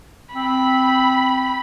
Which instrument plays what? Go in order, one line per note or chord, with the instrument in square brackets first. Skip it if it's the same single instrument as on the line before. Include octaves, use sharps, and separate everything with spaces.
[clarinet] C4 [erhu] B5